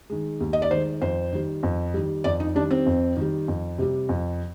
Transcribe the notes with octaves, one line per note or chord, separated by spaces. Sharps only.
D#3 G#3
D#2
D#5
D5
D#3 G#3 C5
F2 C5
D#3 G3
F2
D#3 G3
F2 D5
D#4
D#3 G3 D4
C4
F2
D#3 G3
F2
C3 G3
F2